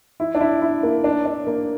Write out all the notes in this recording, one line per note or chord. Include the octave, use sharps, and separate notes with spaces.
E4
D4
E4
E4
A#3
D4
D4
A#3